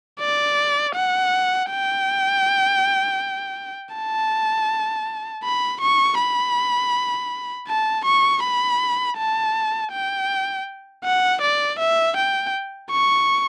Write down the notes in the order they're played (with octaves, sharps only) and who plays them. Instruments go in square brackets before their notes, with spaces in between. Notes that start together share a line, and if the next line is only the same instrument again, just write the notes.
[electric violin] D5
F#5
G5
A5
B5
C#6
B5
A5
C#6
B5
A5
G5
F#5
D5
E5
G5
C#6